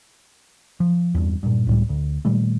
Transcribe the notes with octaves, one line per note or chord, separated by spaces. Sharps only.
F3
E2 G2
G2 A#2
C#2 A2 G3
D2
A#2 D#3 G3 A3